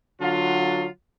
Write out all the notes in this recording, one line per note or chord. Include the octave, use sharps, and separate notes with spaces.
D3 F#3 F4